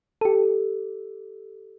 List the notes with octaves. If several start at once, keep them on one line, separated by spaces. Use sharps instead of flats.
G4 A4